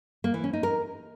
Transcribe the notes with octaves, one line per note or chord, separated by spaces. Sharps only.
A#3
E3
C#4
D#4
A#4